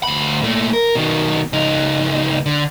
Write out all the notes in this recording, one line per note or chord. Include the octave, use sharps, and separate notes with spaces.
D2 B5
A#2 A3
A#4
B2 D#3
C#2 D#4
D3